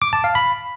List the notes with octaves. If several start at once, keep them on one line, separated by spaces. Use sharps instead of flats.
D6
A5
F5
B5